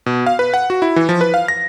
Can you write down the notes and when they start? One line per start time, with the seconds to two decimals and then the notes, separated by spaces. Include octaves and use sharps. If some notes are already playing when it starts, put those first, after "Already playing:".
0.06 B2
0.26 F5
0.39 B4
0.54 F#5
0.70 F#4
0.82 E4
0.96 E3
1.09 F3
1.21 B4
1.34 F5
1.48 A#6